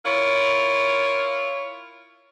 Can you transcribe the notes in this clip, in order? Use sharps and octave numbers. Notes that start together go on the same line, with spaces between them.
E4 F4 A#4 C#5